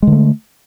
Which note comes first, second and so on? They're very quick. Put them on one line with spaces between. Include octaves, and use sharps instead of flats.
G#3 D3 A3